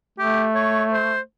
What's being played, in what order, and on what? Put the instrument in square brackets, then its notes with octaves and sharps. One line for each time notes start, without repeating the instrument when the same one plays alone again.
[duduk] A3 [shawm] G4
[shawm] C#5
C5